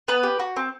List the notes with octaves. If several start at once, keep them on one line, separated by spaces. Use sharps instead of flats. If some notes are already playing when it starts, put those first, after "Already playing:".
B3 B4
G4
F#4
C4